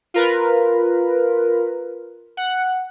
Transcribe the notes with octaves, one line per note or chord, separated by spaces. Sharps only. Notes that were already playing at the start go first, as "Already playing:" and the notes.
F4 A#4 B4
F#5